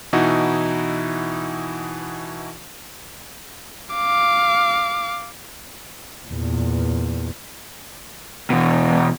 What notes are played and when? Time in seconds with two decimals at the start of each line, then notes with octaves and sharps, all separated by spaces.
0.13 B2 E3 D#4 E4 F#4
3.94 F5 D6
6.28 E2 A#2
8.50 E2 B2